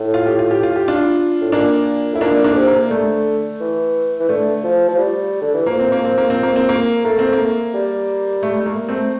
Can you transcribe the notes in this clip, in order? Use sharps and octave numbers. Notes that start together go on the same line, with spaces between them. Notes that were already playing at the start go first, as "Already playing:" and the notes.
Already playing: A2
F4
G4
F4
G4
F4
G4
D4 F4
A2
A#2 A#3 D4
A2 E4
A#2 A#3 D4
A#3 D4
D3
C3
A#3
D3 A3
E3
E3
D3 A3
F3
F3
G3
D3
E3
F3 A#3
C4
A#3
C4
A#3
C4
A#3
C4
A#3
A3 A#3
C4
A#3
G3
A3
A3
A#3
A3 C4